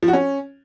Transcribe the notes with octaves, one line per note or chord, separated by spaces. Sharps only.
F3
F#4
C#4